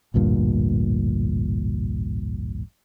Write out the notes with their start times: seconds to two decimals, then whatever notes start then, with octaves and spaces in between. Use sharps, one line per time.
0.14 A1 D2 G2 A#2